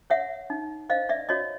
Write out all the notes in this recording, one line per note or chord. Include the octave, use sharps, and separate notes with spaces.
C#5 E5 F#5
D#4
C5 D#5 F5
D5 E5
F#4 C#5 D#5